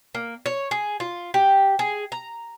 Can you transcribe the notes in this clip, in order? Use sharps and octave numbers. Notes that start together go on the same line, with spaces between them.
A#3
C#5
G#4
F4
G4
G#4
A#5